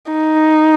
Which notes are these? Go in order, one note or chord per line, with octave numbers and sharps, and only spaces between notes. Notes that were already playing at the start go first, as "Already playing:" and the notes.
D#4